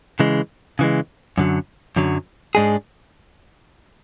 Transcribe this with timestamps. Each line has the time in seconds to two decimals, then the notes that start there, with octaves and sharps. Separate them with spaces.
0.20 C#3 E3 G#3
0.79 C#3 E3 G#3
1.38 F#2 D3 F#3
1.96 F#2 D3 F#3
2.55 G#2 G#3 D4 G#4